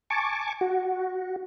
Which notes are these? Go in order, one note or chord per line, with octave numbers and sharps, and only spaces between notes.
G#5 A5 C#6 D6
F#4